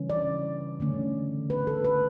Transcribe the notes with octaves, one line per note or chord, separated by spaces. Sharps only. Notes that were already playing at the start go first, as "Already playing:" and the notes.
Already playing: C#3 E3 G3 C#4
D5
D3 A3 C#4
B4
A4
B4